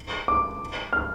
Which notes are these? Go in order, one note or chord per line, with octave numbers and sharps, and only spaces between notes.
D6
F6